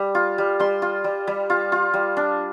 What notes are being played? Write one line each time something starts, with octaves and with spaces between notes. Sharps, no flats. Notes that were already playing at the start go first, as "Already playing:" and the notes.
Already playing: G3
F4
G3
G3 C6
F4
G3
G3
F4
F4
G3
D4